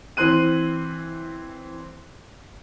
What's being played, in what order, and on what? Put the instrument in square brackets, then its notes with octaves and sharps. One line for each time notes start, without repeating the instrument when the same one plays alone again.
[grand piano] E3 C4 C6 F#6 D#7